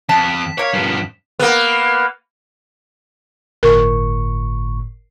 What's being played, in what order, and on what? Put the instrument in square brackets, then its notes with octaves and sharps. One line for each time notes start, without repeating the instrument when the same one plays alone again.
[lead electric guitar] F2 [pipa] A5 [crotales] B6 E7
[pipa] A#3 A#4 F5 [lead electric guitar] C#5
[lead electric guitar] G2 F3
[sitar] A#3 B3
[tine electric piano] G1 A2 C#6 [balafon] A#4